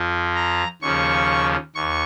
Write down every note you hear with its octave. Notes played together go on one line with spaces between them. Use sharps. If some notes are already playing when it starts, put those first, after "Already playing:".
Already playing: F2 F3
A#5
D#2 C#3 F3 C#6
D#2 C#6